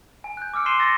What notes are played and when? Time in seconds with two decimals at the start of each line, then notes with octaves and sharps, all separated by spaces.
0.24 G#5
0.37 F#6 G6
0.53 D6 E6 F6 C#7 D7
0.66 C6 F#6 C7 D#7 E7 G7
0.79 E6 A6 A#6 C#7 E7